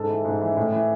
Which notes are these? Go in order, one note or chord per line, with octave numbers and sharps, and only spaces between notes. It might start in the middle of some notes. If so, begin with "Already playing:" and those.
Already playing: G#2 A4
E3
G#2
E3
A2
E3